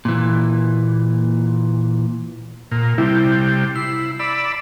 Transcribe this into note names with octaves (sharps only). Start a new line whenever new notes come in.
A#2 E3
A#2
C3 G3 E4
E4 C7
D5 B5 E6